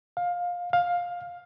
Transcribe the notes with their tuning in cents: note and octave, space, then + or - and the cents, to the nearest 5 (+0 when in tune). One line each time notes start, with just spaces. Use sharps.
F5 +20
F5 +15